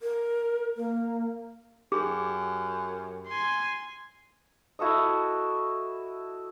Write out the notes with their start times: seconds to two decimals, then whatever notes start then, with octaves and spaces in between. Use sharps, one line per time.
0.01 A#4
0.77 A#3
1.92 F#2 G4 G#4
3.28 G#5 C6
4.79 E4 F#4 A4 D#5